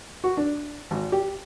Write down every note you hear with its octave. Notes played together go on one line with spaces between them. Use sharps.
F#4
D4
G#1
G4